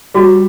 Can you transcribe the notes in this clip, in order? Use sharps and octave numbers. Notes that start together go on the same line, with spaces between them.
G3 F#4